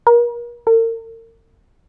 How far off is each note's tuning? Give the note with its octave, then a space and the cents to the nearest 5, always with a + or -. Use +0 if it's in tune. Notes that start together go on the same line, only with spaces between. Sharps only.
A#4 +40
A#4 -40